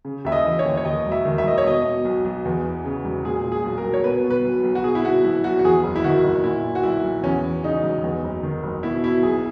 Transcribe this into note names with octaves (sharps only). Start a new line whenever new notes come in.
C#3
D#2 E5
D#5
E3
C#5
D#2
C#5
D#2 D#5
E1
E5
D#3
E5
E1 D#5
C#5
B2 D#5
B2
B1
B1
E2
E3
C#3
E1
A#2 G#4
A#2
G#4
B1
A#4
B1
C#5
B2 B4
B2
B4
B1
B1
F#4
B2 G#4
E4
B2 F#4
B1 E4
B1 F#4
F#4
E2 G#4
F#1
E4
D#3 F#4
F#1
A#2 E4
A#2
F#4
B1 E4
B1
E2 C#4
E3
C#3 D#4
E1
E2
F#1
D#3
F#1
B2 E4
B2 E4
B1 G#4